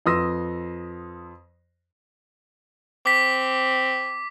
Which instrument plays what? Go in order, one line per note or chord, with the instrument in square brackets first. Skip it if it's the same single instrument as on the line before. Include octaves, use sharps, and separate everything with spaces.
[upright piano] F2 B4 C6 D#6 E6 A#6
[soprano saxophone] C4 [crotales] D6 B6